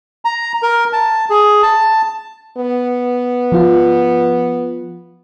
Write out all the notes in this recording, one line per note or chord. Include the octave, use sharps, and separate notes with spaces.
A#5
A#4
A5
G#4
A5
B3
F3 F4